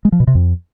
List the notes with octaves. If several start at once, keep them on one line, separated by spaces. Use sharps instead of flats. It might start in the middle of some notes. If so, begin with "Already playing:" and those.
G#3
F3
B2
C3
F2